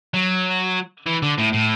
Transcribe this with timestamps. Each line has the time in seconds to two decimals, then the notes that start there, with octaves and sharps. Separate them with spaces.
0.14 F#3
1.06 E3
1.22 D3
1.38 A2
1.53 A2